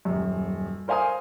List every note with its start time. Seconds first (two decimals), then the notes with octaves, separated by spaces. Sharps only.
0.05 D#1 F#2
0.88 A#4 C5 F5 G#5 A#5 D#6